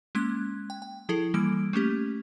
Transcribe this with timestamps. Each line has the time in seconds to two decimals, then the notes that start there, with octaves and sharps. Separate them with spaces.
0.15 G#3 A#3 C#4 F#6 G#6
0.70 G5
0.82 G5
1.09 F3 E4 G#4 A4
1.34 E3 G3 A#3 E6 D7
1.73 A3 A#3 C#4 G4